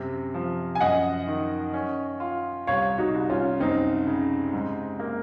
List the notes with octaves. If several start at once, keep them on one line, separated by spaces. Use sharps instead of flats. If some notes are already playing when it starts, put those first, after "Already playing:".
Already playing: F#2 C3
F3
G#5
F#2 D#5 F#5
D#3
C#4
F4
C2 C#5 F5
D#4 F#4
C2
C#4 F4
F#2 C4 D#4
C#3
G#2
A#3